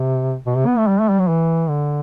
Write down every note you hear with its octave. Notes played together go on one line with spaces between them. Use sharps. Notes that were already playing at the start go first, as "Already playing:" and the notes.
Already playing: C3
B2
C3
B3
A3
G3
A3
G3
F#3
E3
D3